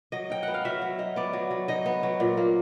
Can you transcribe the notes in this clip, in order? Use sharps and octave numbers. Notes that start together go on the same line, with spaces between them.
F#3 D#5
D#4 G5
B3 F#5
F5
F#3 E5
F#3
D#4
B3 D5
F#3
F#3
D#4 D#5
B3
F#3
A#2
A#3